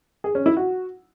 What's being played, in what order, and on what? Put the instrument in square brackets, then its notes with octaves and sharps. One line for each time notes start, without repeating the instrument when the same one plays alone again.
[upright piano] G#4
C#4
E4
F#4